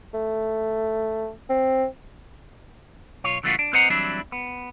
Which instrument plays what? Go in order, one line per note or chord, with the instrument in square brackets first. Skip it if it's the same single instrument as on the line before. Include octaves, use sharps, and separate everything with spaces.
[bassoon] A3
C4
[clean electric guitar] B1 F4 C#5
C#3 E3 G3 A3 F4 F#4
D4
C4 B4 C5 D#5 F#5 A#5
E3 F#3 G3 C4 D4 E4
B3